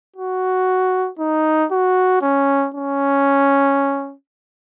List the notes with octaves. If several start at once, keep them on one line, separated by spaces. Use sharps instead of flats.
F#4
D#4
F#4
C#4
C#4